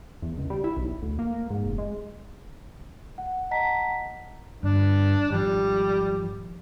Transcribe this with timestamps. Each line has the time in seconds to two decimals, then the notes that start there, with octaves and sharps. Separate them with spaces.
0.22 E2
0.38 C#2
0.50 G3
0.64 E4
0.77 B1
1.02 D2
1.19 A#3
1.50 G#2
1.65 F1
1.78 G#3
3.18 F#5
3.51 D#5 F#5 A5 A#5 B6
4.63 G1 G2 D4
5.31 G#1 F3 G3